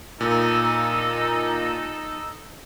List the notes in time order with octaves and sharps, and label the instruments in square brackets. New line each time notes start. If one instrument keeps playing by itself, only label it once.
[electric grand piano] A#2 [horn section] D#4 A4